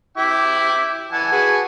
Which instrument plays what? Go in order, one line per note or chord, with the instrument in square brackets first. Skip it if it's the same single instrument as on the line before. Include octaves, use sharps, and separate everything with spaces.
[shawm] E4 [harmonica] E5 G5 D6
[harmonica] E3 F#5 A5 [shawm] G#5
[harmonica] F#4 G#4 B4